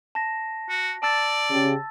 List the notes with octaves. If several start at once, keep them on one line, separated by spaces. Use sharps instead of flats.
A5 A#6
F#4
D5 A5 E6 A6
C#3 G4